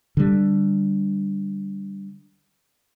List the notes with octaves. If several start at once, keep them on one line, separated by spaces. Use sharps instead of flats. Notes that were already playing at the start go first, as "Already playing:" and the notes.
D3 G3